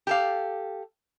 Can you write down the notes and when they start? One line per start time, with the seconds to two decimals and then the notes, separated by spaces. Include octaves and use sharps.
0.07 G4 A4 F5